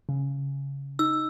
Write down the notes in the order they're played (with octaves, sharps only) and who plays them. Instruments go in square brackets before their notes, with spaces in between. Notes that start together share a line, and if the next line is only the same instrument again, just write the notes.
[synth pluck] C#3
[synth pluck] D#4 [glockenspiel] E6